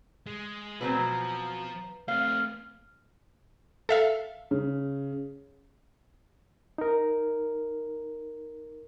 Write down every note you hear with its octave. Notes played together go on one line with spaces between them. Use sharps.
G#3
B2 F#3 A3 C4 F#4 B4 A#5
F3
A3 C4 F5 F6 G7
A4 E5 F5
C#3
D#4 A#4